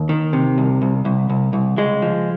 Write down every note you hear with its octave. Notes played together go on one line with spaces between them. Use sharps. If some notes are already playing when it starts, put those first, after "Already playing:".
Already playing: D#2
D#3
C3
C2
C2
C2
C2
C2
C#2 G#3
F3